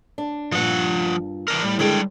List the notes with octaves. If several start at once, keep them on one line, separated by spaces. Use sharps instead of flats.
D4
G2 A#2 F3 F#5
E3 D4 A#4
A2 G3
D3 D#3 G3 G#3 C#5 G5